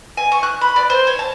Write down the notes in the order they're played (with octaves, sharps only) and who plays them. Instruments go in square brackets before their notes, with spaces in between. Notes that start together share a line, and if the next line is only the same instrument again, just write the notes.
[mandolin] G#5
C#6
F#6
B5
D5
C5
C#5
A5